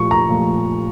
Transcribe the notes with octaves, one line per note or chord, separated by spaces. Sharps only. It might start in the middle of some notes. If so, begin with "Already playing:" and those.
Already playing: A#2 F3 A3 C#6
A#5
A#2 F3 A3